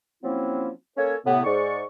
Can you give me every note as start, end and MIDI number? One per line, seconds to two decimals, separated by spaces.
0.23 0.69 53
0.23 0.69 54
0.23 0.69 58
0.23 0.69 60
0.23 0.69 61
0.23 0.69 64
0.97 1.15 58
0.97 1.15 61
0.97 1.15 69
0.97 1.15 73
1.25 1.41 45
1.25 1.41 48
1.25 1.41 59
1.44 1.82 44
1.44 1.82 74
1.44 1.82 85